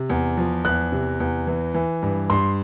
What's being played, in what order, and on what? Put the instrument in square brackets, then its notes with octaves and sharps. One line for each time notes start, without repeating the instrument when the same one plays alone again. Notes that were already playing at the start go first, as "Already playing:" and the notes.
Already playing: [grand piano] C3
E2
F3
E2 F#6
C3
E2
E3
E3
G2
G2 C6